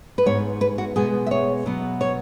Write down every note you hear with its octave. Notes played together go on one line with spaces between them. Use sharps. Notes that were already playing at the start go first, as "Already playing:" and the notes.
B4
G#2 G#3 B3 C#5
B4
F#4
B2 G#3 B3 G#4
E5
C#5
B2 F#3 B3
C#5